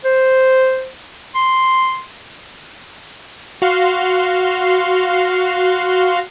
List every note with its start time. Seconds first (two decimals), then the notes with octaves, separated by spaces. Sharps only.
0.05 C5
1.35 C6
3.62 F#4 F5 C6